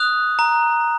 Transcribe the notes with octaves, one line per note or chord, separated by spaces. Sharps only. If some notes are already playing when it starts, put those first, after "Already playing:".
Already playing: D#6 F#6 F7
A#5